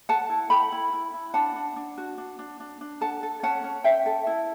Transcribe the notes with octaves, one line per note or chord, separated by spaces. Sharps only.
A4 F#5 A5
E4
A4 G5 B5
E4
E4
E4
D4 F#5 A5
D4
D4
F#4
D4
D4
D4
D4
A4 F#5 A5
A4
C#4 F#5 A5
C#4
C#4 E5 G5
A4
E4